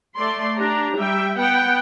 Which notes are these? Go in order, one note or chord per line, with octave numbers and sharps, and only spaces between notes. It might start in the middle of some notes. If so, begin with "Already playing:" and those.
A3 D5 C6
D4 G4 A#5
G3 E5 G5
B3 F#5 G5